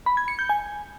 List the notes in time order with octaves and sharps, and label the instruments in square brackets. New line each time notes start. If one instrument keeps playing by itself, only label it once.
[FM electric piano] B5
G#6
C#7
G6
G#5